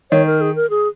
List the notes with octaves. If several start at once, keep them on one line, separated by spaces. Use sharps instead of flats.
D#3 C#5
A#4
G#4
A#4
G#4